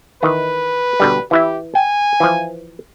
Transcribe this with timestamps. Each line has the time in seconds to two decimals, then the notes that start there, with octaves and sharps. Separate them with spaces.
0.23 D#3 E3 B4
1.00 B2 D3 G3
1.31 E3 E4 G4 E5
1.75 G5 G#5
2.20 E3 F3